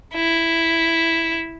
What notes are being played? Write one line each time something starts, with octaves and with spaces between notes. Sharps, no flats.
E4